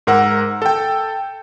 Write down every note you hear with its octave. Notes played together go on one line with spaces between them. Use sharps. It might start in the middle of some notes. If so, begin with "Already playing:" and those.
G#2 A#4 F#5 E6
A4 G5